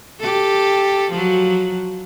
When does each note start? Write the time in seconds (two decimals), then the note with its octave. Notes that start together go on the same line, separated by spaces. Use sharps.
0.19 G4 A4
1.11 F3 F#3